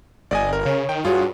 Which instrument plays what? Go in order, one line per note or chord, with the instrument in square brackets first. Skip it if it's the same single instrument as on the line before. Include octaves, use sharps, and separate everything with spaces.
[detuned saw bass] G1 [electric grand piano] D5 D#5 G#5
[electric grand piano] A#4
[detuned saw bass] C#3 [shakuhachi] C#5
[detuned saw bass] D#3 [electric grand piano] G5
[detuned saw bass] G2 [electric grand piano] F4 G#4 C#5 [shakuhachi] F#4